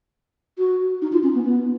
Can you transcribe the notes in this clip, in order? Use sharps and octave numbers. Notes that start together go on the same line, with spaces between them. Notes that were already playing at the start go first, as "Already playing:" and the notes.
F#4
D#4
F4
C#4
B3
B3